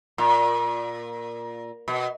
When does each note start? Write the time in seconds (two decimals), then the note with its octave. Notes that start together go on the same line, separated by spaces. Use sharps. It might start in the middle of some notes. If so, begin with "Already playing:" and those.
0.18 A#2
1.88 B2